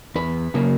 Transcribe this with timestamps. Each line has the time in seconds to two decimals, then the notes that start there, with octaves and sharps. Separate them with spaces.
0.15 E2 B4
0.54 C#3 F#3 A#3